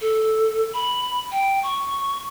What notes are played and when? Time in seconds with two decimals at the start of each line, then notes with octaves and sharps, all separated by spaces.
0.01 A4
0.74 B5
1.32 G5
1.63 C#6